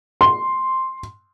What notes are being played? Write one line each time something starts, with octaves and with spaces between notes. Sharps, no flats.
C6